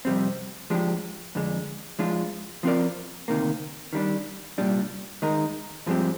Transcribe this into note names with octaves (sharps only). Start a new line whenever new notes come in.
F2 C3 G3 C4
F3 G#3 D4 G4
F2 D3 G#3
F3 G#3 D4 F4
F3 C4 F4 A#4 D5
D2 C3 D#3 A#3
D#3 G3 D4
C2 A#2 G3 D4
D#3 G#3 D#4 A#4
G2 F3 G#3 C4 G4